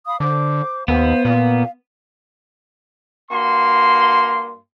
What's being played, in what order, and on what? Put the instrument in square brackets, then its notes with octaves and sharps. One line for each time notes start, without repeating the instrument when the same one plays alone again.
[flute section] F5 B5 D#6
[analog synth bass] D3 [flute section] C5 D6
[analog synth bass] D#2 [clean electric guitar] B3 [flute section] C5 F5
[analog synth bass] A#2 [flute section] F5
[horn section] G2 A#3 F#4 C6